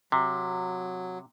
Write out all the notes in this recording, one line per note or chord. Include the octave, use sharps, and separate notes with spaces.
C3 F#3